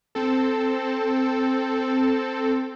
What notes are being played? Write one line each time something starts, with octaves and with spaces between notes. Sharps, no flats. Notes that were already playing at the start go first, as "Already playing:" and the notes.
C4 A4